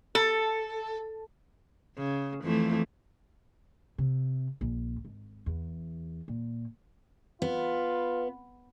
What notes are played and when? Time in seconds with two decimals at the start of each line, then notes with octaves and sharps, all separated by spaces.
0.15 A4
1.97 C#3
2.43 F2 E3 A3
3.98 C3
4.61 A#1
5.05 G#1
5.46 E2
6.28 A#2
7.42 B3 F4